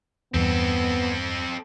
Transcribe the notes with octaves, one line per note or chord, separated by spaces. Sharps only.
E2 G2 B3 C4 A4